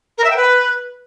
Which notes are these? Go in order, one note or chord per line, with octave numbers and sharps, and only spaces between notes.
A#4
E5
G5
B4